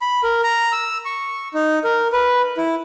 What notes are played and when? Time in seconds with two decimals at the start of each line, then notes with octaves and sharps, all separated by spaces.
0.01 B5
0.24 A#4
0.44 A#5
0.72 E6
1.05 C#6
1.54 D#4
1.84 A#4
2.13 B4
2.57 E4